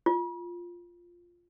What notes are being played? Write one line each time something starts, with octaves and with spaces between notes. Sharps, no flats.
F4